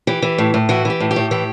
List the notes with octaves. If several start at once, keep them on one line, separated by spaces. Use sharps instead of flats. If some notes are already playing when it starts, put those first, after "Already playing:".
E3 G4
E3
A2
A2
E3 F#4
E3 G4
A2
G4
A2
E3 G4